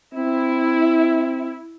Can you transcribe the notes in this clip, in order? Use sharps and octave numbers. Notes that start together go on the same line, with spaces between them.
C4 E4